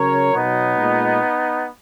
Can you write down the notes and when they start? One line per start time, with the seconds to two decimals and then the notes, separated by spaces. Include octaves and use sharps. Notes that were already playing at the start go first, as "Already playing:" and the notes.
Already playing: C#3 F#3 A#4 C#5
0.34 B2 F#3 B3 D#4
0.76 A#2 G#3